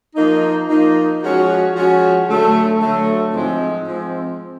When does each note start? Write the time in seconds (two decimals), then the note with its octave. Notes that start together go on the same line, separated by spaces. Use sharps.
0.15 F3 A#3 D#4
0.67 F3 A#3 D#4
1.21 F3 G#3 C#4 F#4
1.73 F3 G#3 C#4 F#4
2.27 D3 F#3 A3
2.80 D3 F#3 A3
3.32 G#2 F3 G#3 C4
3.86 F3 G#3 C4